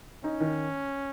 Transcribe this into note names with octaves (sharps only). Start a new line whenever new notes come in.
C#4 D#4
D#3